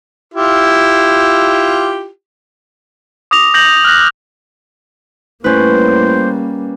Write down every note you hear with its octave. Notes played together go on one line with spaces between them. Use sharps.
E4 F4 G4
D6 D#6 A#6 F7
G6 A#6 F#7
F6 F#6 A#6
A2 G3 A#3 C#4 B4 C5